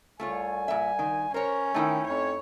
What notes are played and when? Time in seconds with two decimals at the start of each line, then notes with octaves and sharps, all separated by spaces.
0.20 C2 A3 F4 C#5 G#5
0.68 A#2 E5
0.99 D#3
1.34 C#4 A#4 C5 C#5
1.74 D#3 A3 D#4 E4 G5
2.08 F2 C#4 C#5